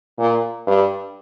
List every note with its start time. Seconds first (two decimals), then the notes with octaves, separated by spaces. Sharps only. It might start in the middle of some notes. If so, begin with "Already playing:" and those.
0.19 A#2
0.67 G2